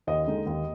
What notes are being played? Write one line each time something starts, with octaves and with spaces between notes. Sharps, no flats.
D#2 D#5
D3 G#3 D#4
D#2